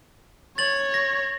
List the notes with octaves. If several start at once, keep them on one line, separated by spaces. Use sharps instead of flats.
C#5 A6 F#7
A#6